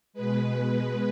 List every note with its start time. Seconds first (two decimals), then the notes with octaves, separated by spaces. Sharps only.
0.13 B2 G#3 B4